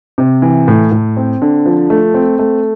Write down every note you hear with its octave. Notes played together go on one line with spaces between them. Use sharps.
C3
E3
A2
A2
C4
D3
F3
A3
C4
A3